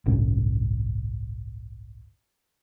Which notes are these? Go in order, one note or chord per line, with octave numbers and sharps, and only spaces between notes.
G1 C2 A2 C#4